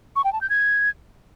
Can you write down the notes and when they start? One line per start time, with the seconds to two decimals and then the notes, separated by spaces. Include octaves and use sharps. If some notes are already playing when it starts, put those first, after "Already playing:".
0.16 C#6
0.24 G5
0.33 A5
0.41 G6
0.50 G#6